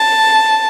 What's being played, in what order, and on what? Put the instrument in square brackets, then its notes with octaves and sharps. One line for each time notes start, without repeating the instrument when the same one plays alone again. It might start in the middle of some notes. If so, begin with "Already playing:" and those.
Already playing: [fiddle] A5